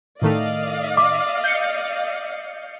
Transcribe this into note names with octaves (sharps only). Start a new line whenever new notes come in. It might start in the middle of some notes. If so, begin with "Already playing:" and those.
A2 D#3 A3 D5 D#5 F5
D6
G6 C7 C#7